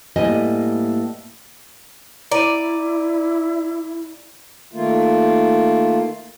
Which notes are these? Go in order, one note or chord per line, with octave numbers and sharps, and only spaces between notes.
A2 G3 A#3 B3 D#5 G#5
E4 D5 A#5 D#7
D#3 A3 A#3 F4